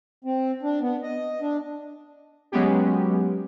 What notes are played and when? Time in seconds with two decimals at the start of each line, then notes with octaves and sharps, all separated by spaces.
0.25 C4
0.63 D4
0.81 B3
1.02 D#5
1.41 D4
2.52 F#3 G#3 B3 C#4 G4